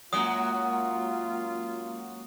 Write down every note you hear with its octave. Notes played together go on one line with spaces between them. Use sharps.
F#2 F#3 G#3 A#3 F4 D#6